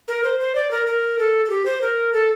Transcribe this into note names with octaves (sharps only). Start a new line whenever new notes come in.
A#4
C5
C5
D5
A#4
A#4
A4
A4
G4
C5
A#4
A4